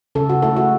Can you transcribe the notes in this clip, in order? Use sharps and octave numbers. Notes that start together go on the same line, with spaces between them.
C#3 A4
F#4
A3 E4 A4
F#4